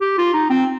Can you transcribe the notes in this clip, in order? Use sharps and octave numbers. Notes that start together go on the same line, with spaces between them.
G4
F4
D#4
C4